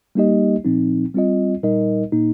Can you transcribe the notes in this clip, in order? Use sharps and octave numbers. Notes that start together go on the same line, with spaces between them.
G3 A#3 D#4 G4 D#5
A#2 F3 C4 D#4
G3 C4 F4 D#5
A#2 G3 D#4 A#4 D#5
A#2 A#3 D#4